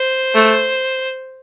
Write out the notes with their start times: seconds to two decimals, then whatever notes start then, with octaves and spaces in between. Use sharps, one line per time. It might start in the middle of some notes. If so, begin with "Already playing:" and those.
Already playing: C5
0.35 A3